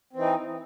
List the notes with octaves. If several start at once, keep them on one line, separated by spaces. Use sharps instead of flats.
E3 C4 D#4